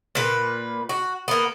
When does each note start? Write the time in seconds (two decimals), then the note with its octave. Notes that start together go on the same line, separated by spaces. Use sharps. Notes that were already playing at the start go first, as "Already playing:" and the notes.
0.15 A#2 B4
0.89 F#4
1.28 A#3 B3